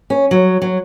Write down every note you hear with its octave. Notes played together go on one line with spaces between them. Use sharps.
C#4
F#3
F#3